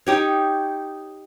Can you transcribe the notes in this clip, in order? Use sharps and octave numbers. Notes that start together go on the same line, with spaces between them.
D#4 G4 C#5